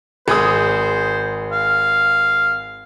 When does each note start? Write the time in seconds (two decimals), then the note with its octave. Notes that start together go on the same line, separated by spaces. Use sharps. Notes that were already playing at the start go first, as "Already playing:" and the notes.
0.28 G#1 G#4 C5 D#6
1.52 F5